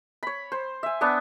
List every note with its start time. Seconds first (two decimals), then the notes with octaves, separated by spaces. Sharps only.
0.23 C#5 B5
0.52 C5
0.83 E5 G#5
1.01 B3 D4 F#5 G#5